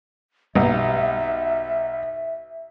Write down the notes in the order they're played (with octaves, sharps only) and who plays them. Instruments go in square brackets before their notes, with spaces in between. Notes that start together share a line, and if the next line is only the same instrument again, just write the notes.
[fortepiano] B1 [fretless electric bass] G3 [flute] E5